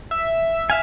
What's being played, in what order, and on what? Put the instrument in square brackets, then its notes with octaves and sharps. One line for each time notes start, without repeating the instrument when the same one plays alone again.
[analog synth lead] E5
[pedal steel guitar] E5 F5 G#5